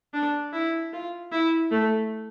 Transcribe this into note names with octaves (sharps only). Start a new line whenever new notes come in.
D4
E4
F4
E4
A3